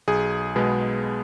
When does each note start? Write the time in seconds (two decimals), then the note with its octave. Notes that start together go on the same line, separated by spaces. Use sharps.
0.08 B1 G#4
0.56 B2 G#3 B3